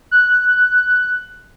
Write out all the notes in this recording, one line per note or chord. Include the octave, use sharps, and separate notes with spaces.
F#6